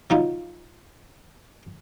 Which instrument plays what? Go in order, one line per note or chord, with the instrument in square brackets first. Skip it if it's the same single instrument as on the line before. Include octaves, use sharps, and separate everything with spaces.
[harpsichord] F#3 D#4 F4